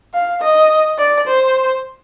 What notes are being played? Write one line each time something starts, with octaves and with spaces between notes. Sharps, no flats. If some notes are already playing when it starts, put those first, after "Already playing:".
F5
D#5
D5
C5